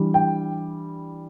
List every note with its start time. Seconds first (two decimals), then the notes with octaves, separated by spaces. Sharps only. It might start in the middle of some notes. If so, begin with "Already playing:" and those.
Already playing: E3 G3 D4
0.14 G5